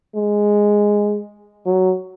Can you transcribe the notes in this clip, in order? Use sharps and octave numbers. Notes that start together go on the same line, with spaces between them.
G#3
F#3